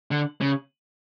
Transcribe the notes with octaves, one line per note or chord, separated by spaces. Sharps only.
D3
C#3